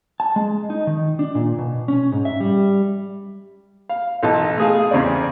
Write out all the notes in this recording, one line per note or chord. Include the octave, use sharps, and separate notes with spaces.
A5
G#3
D#4
D#3
D4
A#2
B2
C#4
G#2
E5
G3
F5
B1 E3 D#5 A5
A3 G#4 F5
E2 C#3 C4 D5